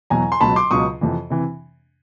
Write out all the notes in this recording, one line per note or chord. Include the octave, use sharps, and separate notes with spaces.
E2 B2 F#3 G#5 A#5
C6
C#2 B2 F#3 A5 B5
C6 D6
C#2 B2 F#3 C#6 D#6
F2 C3 E3
C3 E3